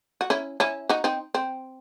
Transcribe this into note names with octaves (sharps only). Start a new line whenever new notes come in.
F#4
C#4 E4
C#4 E4
D#4 F#4
C4 D#4
C4